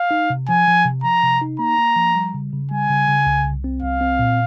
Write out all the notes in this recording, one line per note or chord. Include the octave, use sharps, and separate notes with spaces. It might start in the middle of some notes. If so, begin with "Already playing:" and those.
Already playing: F5
D#4
C3
F3 G#5
F3
C3
F3 A#5
C3
D#4
A#3 A#5
A#3
F3
G3
C#3
C#3
G3 G#5
C#3
C#3
C2
C2
C4
C2 F5
C4
A#2